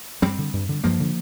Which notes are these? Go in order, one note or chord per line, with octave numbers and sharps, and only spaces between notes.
G2 G3 C4
D3
G2
D3
G2 F3 A#3
D3